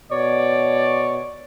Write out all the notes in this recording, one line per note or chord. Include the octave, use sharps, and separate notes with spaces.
B2 C#5 D5